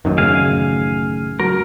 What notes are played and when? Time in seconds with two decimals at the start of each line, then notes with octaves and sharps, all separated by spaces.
0.05 A1 F#2 D#3
0.18 C#3 A3 G#4 F5 G#5
1.40 F#3 G#3 F#4 A#4